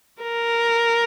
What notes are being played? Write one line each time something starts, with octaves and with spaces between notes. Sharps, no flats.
A#4